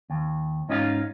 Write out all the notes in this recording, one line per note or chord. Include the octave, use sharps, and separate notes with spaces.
D#2
G#2 C#4 D#4 F4 G#4 F5